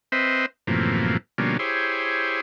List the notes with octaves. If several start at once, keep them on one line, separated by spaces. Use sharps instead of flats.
C4 B4 C5 D#5 E5
F#2 A2 C3 E3 F3 A#3
B2 D3 F3 G3 A#3 C#4
E4 G4 G#4 C5 C#5